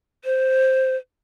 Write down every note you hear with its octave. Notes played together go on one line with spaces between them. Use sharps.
C5